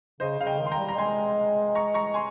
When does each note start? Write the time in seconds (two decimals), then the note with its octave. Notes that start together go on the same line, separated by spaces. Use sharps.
0.20 C#3 C5 D#5
0.39 C#3 F5
0.46 D#5 G5
0.59 D#3
0.66 C6
0.72 G5 A#5
0.78 G3
0.88 A#5
0.98 G#3 G#5 C6
1.75 A#5 C#6
1.94 A#5 C#6
2.14 G#5 C6